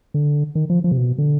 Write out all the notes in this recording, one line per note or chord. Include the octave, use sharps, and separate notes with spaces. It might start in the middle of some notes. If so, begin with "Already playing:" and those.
D3
D#3
F3
F3
C3
B2
D3